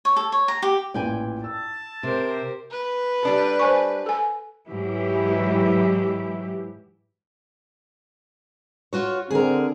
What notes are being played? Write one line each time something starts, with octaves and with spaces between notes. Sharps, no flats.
C#5
A4
C#5
A#5
G4
A1 A#2 B4 D5 G5 G#5
A5 E6
C3 G4 A#4 C5
B4
G3 D4 A4
C5 G#5 C#6
A4 G#5
G#2 E3 F#3 E4 G4
F4 F#4 C#5
D3 C4 G#4 A#4